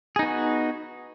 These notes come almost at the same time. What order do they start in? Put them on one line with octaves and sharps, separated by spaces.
G#4 D#4 B3 F#4